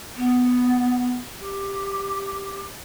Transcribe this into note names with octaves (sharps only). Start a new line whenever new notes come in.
B3
G4